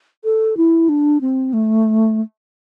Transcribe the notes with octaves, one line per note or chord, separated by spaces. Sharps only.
A4
E4
D4
C4
A3